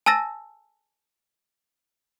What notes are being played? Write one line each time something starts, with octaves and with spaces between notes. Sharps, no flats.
G#5 A5 E6 A6 A#6